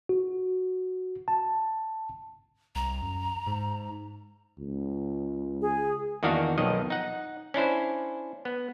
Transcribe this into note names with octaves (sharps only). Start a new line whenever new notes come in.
F#4
A5
C2 A#5
F#2
G#2
C#2
G#4
E2 D#3 A#3 D4 F#4 F5
B1 F2 D#3 D#5
D#4 F#5
C#4 D4 E4 C5
B3